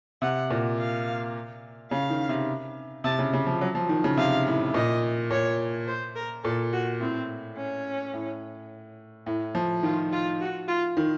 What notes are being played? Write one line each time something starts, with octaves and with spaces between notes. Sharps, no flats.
C3 F#5
A#2
F5
C#3 F5
D#3
C3
C3 A5
C#3
C#3
F3
F#3
F3
D#3
C#3
C3 F5
A2
A#2 D#5
A#2 C#5
C5
A#4
A#2 A4
F#4
A2 C4
C#4
A2
A2
F3
D#3 F4
F4
F#4
F4
D#3